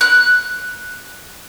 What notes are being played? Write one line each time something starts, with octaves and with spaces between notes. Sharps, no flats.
F#6